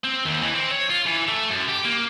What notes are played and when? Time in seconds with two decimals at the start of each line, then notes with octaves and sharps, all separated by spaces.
0.04 C4
0.25 D#2
0.42 E3
0.55 C4
0.71 C#5
0.90 F4
1.06 E3
1.28 A3
1.49 F#2
1.68 G4
1.84 A#3